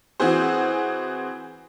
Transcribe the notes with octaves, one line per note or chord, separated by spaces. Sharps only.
E3 C4 F#4 G#4 C5